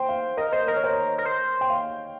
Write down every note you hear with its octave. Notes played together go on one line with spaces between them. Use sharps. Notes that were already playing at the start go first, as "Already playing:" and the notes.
Already playing: C5 G5
F5
A#4 D#5
C5 D#5
A#4 D#5
C#5
C5
C#5
A#4
C5
G5
F5